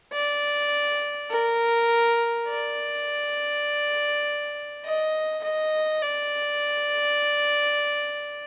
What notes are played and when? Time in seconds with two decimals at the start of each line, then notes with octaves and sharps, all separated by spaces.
0.13 D5
1.31 A#4
2.49 D5
4.84 D#5
5.44 D#5
6.02 D5